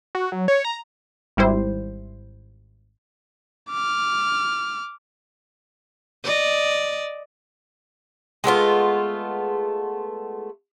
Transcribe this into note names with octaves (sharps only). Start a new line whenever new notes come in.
F#4
F#3
C#5
A#5
G#1 G3 E4 C5
D6 F6
D5 D#5
G#3 A3 B3 F4